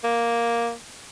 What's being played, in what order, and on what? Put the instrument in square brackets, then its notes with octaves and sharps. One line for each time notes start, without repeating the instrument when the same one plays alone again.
[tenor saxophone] A#3